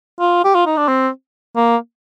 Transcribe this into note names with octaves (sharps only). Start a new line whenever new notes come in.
F4
G4
F4
D#4
D4
C4
A#3